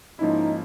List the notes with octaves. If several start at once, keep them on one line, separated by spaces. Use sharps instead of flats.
G#2 F3 A#3 C#4 D#4 E4